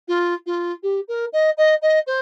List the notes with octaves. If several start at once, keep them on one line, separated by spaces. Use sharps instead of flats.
F4
F4
G4
A#4
D#5
D#5
D#5
C5